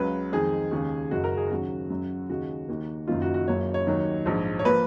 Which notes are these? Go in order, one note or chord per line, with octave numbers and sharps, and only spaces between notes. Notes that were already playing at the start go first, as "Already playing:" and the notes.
Already playing: C#2 C#3 F#3 B4
F2 D#3 G#3 G#4
D#2 C#3 G#3
F#1 F#2 C#3 G#3 F#4
A#4
G#4
D#2 C#3 F#3 F#4
F#2 C#3 F#3
D#2 C#3 G#3 F#4
D#2 D#3 A#3
F#1 F#2 D#3 A#3 F4
F#4
F#4
F#1 F#2 C#3 F#3 A#3 C#5
C#5
D#2 D#3 F#3 A#3
A#1 G#2 F3
C#5
F3 A#3 B4